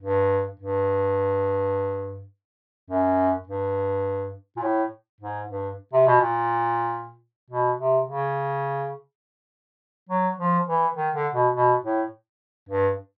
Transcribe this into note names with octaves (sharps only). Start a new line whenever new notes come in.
G2
G2
F#2
G2
A#2
A2
G#2
G2
C3
B2
A#2
B2
C3
C#3
F#3
F3
E3
D#3
D3
B2
B2
A2
G2